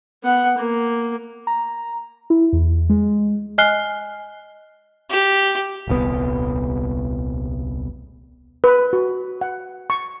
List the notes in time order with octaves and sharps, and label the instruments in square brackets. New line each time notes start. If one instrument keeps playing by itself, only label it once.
[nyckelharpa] B3 F#5
A#3
[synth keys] A#5
E4
E2
G#3
[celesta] D#5 G#5 F6 F#6 C7 G7
[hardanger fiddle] G4
[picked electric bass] D#1 C2 B3
[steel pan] B4
F#4
F#5
C#6